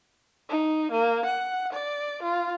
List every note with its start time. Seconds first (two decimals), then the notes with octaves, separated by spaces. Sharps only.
0.50 D#4
0.91 A#3
1.25 F#5
1.73 D5
2.22 F4